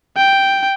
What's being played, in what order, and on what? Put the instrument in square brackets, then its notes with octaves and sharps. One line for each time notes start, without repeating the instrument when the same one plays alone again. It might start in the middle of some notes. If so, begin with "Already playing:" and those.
[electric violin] G5